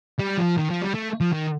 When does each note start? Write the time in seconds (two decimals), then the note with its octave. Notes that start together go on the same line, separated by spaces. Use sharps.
0.19 G3
0.38 F3
0.58 D#3
0.70 F3
0.82 G3
0.94 A3
1.21 F3
1.33 D#3